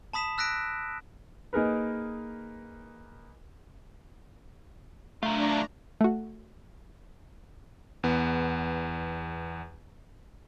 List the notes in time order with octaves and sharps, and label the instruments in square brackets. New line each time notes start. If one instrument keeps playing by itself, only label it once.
[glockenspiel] A5 B5 D#6 B6 E7
E6 F#6 A#6 B6 D7
[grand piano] A#3 D#4 G#4 A#4 B4
[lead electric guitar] F#3 F4 [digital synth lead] A3 [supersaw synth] D4 A#5
[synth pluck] A3 F#4
[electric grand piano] E2 B3